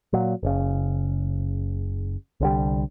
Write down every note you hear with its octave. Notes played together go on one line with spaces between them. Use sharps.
A#2 F#3
F#1 C#3
C2 D3 G3